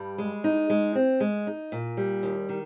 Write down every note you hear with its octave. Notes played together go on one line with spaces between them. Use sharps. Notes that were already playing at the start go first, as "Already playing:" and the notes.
Already playing: G2 G3
G#3
D#4
G#3
C4
G#3
D#4
A#2
G3
D#2
D#3